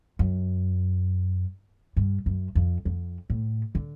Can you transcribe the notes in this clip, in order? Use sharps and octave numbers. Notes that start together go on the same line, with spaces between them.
F#2
G2
F#2
F2
F2
A2
D3